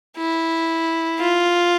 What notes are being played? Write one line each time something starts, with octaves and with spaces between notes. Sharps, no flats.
E4
F4